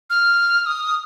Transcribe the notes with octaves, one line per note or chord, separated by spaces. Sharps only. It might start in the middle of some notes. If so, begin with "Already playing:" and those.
F6
D#6